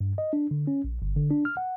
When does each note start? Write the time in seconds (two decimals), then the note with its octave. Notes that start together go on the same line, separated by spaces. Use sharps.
0.01 G2
0.18 D#5
0.33 D4
0.51 D3
0.67 C#4
0.84 A#1
1.02 G1
1.16 D3
1.31 D4
1.45 F6
1.57 F#5